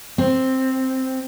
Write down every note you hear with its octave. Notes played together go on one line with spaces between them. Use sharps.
C4